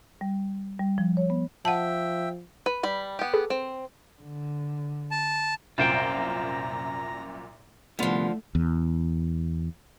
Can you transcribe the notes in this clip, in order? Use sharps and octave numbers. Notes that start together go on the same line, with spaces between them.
G3
G3
F3
C#5
B3
F3 E5 F#5 G5 A5
B4
G3 B5
B3 G4
G#4 A4 B4
C4
D3
A5
C2 F#2 A#2 F4 C5 G5 A#5
C2 D3 F3 A3 B3 F4
E2